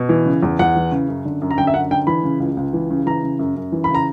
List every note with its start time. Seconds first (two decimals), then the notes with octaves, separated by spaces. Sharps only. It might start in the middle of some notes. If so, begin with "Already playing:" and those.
Already playing: B2
0.09 E3
0.26 C#3
0.43 E2
0.59 E2 F#5
0.76 E3
0.92 C#3
1.08 F#2
1.25 D3
1.42 F#2
1.51 A#5
1.58 D3 G5
1.67 E5
1.74 F#2 F#5
1.91 D3 G5
2.07 E3 B5
2.24 C#3
2.40 C#2
2.57 C#2
2.73 E3
2.90 C#3
3.06 E3 A#5
3.23 C#3
3.39 F#2
3.56 F#2
3.72 E3
3.84 C#3 B5
3.95 A#5